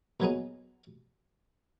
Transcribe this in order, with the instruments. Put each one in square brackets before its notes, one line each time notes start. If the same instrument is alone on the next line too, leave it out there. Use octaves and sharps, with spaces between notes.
[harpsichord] A#2 F#3 B3 D#4 G#4